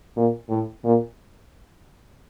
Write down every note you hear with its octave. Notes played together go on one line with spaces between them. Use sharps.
A#2
A2
A#2